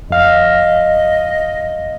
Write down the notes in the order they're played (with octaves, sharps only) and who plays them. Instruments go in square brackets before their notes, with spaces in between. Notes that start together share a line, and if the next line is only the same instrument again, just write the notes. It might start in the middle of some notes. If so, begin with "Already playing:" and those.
[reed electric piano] F2 F5 F6 [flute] D#5